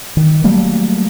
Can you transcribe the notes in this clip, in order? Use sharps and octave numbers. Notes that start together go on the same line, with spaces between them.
D#3
F#3 G3 A3 A#3